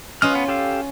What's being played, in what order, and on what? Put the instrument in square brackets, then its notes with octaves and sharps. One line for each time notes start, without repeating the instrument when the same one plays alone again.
[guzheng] C#4 F4 [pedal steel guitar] B4 D#5 F6
[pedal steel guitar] B3
G4 A4 F5